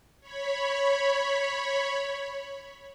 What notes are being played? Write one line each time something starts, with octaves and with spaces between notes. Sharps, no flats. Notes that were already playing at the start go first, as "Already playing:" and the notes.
C#5 B5